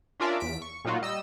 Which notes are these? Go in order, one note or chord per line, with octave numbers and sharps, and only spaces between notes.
C#4 D4 F4 A#4 D5 E5
E2 B6 D7
C#6
A#2 F#3 D#4 F4 F#4
G3 D#5 E6